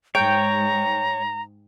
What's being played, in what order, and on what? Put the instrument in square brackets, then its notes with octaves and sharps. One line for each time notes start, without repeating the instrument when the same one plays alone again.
[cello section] G#2 G#3 [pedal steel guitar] C#5 [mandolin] G5 [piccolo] A#5